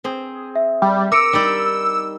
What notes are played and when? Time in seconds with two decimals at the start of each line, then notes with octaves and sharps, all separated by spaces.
0.04 C4 G#4
0.56 E5
0.82 G3
1.12 A#4 D6 E6 C#7 D7
1.33 G3 D#4 D5